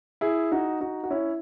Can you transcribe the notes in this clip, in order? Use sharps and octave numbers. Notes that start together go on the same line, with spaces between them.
E4 G#4
D#4 F#4
D#4 F#4
F#4
C#4 E4